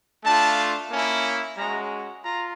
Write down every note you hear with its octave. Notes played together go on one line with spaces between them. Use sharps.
A3 D4 F4 A5
A#3 C#4 E4
G#3 C#4 F#4 A#5
F4 A#5